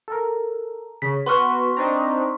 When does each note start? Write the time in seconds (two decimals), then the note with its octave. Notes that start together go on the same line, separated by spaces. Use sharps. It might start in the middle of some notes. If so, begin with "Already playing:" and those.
0.08 A4 A#4
1.02 C#3 B6
1.26 B3 F#4 B4 F#5 C6 C#6 F6
1.77 C4 D4 D#4 A#5